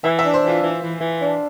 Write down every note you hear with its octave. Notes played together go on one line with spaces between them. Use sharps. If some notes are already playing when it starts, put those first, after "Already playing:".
E3 E5
E5
D4
C5
E3
F4
E3
E3
E3
D4